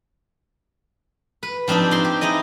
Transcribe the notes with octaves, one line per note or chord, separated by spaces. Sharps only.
B4
F3 C4 D4 D#4 G4
D#4 C6
G4
D#4 E4 G#4 D#5